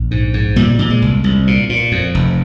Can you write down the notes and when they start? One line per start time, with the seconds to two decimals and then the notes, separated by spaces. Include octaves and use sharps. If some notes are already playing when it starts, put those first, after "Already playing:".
Already playing: A#1
0.11 G#2
0.34 G#2
0.56 A#2 G3
0.79 A#2
0.90 G#3
1.02 C2
1.24 C2
1.47 A#2
1.69 A#2
1.92 F2
2.14 F1